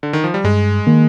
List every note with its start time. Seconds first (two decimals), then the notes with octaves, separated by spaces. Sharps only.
0.03 D3
0.13 D#3
0.24 F3
0.34 G3
0.44 G2 G#3
0.87 D#3 A#3